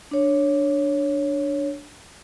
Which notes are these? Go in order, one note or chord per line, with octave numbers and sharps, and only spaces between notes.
D4 C#5